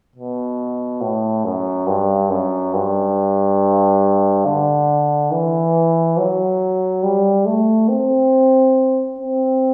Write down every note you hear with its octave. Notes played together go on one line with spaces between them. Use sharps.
B2
A2
F#2
G2
F#2
G2
D3
E3
F#3
G3
A3
C4
C4